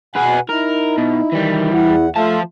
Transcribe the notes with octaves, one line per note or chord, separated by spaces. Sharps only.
B2 G#4 B4 F#5 G#5
D#4 E4 A#4
B2
D#3 E3 G3
E2 E4 F#5
F3 A3 F4 E5 F5 A5